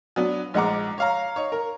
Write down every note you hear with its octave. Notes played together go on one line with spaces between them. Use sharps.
F#3 B3 D4
A#1 G#3 D#4 F#5 A#5 D6
C#5 F5 A#5
D#4 C#5
A#4